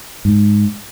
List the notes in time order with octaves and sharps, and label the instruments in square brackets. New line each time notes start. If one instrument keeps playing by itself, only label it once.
[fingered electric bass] G#2